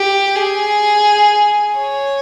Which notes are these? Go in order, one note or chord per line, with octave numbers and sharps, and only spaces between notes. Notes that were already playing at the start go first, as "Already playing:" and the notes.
Already playing: G4
G#4
C#5